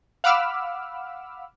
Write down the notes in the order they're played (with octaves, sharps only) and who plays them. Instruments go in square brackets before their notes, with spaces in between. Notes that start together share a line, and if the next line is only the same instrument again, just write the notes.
[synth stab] F5 F#5 B5 D6 E6 F6